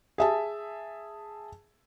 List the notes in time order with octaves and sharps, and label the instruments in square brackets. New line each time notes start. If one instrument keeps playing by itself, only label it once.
[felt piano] G#4 E5 A5